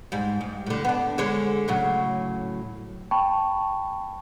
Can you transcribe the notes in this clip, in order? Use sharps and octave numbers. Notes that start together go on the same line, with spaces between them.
G#2 G3
G2
A2 D3
B3 D4
D3 G#3 C#5
A2 C#3 F#3
G5 A5 B5 C#6